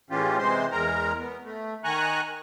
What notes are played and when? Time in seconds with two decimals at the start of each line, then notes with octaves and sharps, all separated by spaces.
0.10 A2 E3 G#3 C#4 F4 G4
0.38 C3 E3 G#3 C5 C6
0.72 E2 G#3 A#4 A#5
1.19 B3
1.43 A3
1.84 D#3 G#5 A#5 C#6 F#6